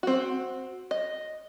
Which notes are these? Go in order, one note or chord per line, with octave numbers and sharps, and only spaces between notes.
C4 F#4
D#5